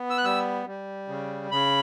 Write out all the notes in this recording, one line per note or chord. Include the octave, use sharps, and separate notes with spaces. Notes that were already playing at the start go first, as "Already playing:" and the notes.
Already playing: B3
E6
F#6
G3 E6
G3
C#3
C#3 B5